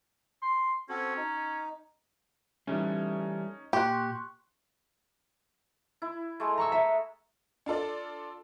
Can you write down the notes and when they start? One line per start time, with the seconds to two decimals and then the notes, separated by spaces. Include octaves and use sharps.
0.42 C6
0.89 C4 C#4 F#4 A4
1.17 D#4
2.67 E3 G3 A3 C#4 D#4
3.73 A#2 G4 C6 C#6 F#6
6.02 E4
6.40 G#3 A3
6.58 A#5 C#6 E6
6.72 E5
7.66 D4 F4 A4 D5